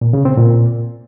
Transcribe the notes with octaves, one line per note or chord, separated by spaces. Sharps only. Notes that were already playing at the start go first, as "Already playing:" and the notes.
A#2
C#3
C4
A#2